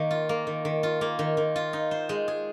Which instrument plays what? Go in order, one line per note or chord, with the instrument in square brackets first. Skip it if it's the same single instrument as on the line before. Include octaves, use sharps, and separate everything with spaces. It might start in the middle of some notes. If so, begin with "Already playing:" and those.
Already playing: [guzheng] D#3 A#3
F4
A#3
D#3
D#3
F4
A#3
D#3
D#3
F4
D#4
C5
G#3
G#4